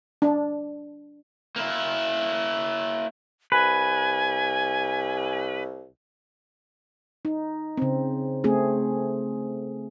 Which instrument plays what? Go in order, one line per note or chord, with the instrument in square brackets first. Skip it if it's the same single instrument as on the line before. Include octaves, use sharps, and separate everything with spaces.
[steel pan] D4
[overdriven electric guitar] A#3 E4
[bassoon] C2 [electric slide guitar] B4 [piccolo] G#5
[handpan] D#4
C#3 C4
A3 C4 G#4